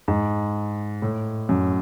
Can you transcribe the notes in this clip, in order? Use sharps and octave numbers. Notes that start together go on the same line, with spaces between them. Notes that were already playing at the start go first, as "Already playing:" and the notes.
G#2
A2
F#2